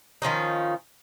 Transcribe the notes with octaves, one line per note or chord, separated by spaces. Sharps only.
D#3 F3 C#4 D#4